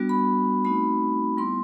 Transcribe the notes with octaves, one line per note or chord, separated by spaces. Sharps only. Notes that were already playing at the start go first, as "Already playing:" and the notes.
Already playing: G3 B3 D4 F#4
B5
A3 C4 D#4 F#4 B5
G3 B3 E4 C6